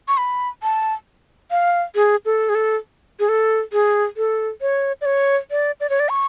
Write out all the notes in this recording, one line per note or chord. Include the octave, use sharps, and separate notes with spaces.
C#6
B5
A5
F5
G#4
A4
G#4
A4
G#4
A4
G#4
A4
C#5
D5
C#5
D5
D5
C#5
D5
C#6